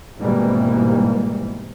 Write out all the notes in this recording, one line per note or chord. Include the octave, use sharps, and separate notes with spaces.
G#1 G#2 B2 E3 G3 A#3